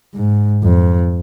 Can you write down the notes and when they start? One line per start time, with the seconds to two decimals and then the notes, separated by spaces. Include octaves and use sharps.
0.15 G#2
0.63 F2